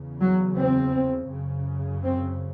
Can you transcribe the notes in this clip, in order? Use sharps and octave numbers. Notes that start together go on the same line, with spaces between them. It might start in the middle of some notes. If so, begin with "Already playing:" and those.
Already playing: E2 C#3
F#3
C4
F#2 C#3
C4